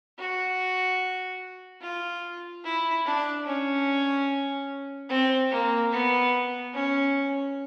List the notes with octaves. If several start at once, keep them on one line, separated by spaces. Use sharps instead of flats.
F#4
F4
E4
D4
C#4
C4
A#3
B3
C#4